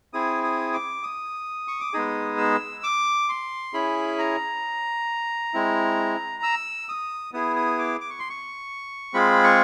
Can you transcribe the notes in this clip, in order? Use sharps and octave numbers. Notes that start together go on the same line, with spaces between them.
C4 E4 G#4 D#6
D#6
D6
D#6
C#6
D6
G#3 B3 D#4 G#4 D#6
E6
D6
C6
C#4 E4 G#4 B5
A#5
G#3 C4 E4
E6
D#6
B3 E4 G#4 D#6
D#6
D6
D6
C#6
C6
C#6
G#3 C4 F4 G#4 B5
C#6